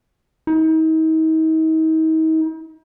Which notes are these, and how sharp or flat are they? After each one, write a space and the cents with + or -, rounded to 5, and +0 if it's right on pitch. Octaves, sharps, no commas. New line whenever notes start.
D#4 +40